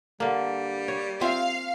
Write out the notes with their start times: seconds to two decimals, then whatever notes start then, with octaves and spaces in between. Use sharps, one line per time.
0.20 D3 G3 A#3
0.88 C#5
1.21 C4 F4 E5 F5 F6 C7